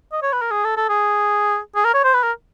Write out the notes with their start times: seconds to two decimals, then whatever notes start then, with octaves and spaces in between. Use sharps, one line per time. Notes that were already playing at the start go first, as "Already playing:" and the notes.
0.13 D#5
0.23 C#5
0.33 B4
0.42 A#4
0.51 G#4
0.64 A4
0.77 A4
0.89 G#4
1.75 G#4
1.85 A#4
1.94 C#5
2.04 C5
2.14 B4
2.23 A#4